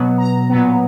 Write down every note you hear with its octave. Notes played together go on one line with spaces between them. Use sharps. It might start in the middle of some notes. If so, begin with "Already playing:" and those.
Already playing: B2 F#3 B3
A#5
A#2 F#3 B3